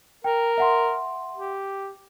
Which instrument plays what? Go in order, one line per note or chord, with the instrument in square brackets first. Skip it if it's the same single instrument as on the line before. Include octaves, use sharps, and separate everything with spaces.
[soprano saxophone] A#4 [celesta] G5
[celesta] E5 F#5 C6
[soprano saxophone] G4